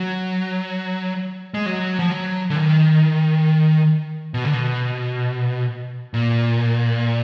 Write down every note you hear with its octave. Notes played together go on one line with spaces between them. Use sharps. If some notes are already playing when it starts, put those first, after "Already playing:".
Already playing: F#3
G#3
F#3
F3
F#3
D3
D#3
B2
D3
B2
A#2